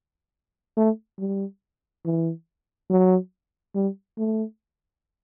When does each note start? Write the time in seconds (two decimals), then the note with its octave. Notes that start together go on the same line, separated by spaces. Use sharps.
0.77 A3
1.19 G3
2.05 E3
2.90 F#3
3.75 G3
4.18 A3